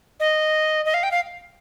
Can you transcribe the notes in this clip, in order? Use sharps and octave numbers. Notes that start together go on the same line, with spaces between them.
D#5
D#5
F5
G5
F5